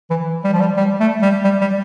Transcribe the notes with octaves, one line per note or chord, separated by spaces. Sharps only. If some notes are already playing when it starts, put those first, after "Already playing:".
E3
G3
F3
G3
G3
A3
G3
G3
G3